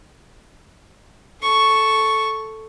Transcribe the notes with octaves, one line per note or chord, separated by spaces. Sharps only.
A4 C#6